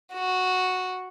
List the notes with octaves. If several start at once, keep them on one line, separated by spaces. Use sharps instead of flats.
F#4